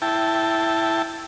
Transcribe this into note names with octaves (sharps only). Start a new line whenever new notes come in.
E4 G5 A5